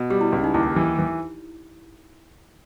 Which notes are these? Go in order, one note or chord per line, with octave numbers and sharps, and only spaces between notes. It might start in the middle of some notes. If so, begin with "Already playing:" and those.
Already playing: B2
G3 G4
E4
C#2
D#4
D#2 E4
E3
E3